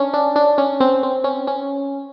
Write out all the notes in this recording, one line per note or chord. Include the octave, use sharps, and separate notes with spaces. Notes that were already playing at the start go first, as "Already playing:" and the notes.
Already playing: C#4 D4
D4
D4
C#4
C4
C4
C#4
C#4